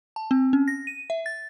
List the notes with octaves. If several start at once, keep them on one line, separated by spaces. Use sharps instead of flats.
A5
C4
C#4
A#6
D#7
E5
A6